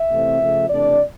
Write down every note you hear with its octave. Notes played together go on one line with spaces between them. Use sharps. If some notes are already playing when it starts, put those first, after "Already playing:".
Already playing: E5
C3 E3 A3 C4
C#3 F3 A3
C3 E3 A3 D4 D5